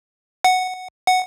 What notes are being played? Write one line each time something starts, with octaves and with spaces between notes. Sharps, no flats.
F#5
F#5